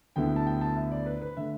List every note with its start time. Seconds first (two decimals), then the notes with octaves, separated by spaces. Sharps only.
0.16 D2 D3 B3 E4 G5
0.36 A5
0.47 G5
0.61 A5
0.76 E5
0.92 D5
1.06 B4
1.22 B4
1.37 D3 A3 E5